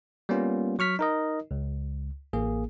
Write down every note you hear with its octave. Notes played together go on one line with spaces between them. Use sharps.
G3 A#3 B3 C#4 F4
F#3 C#6 F6 B6
D#4 A#4 D#5
C#2
A1 A#3 G#4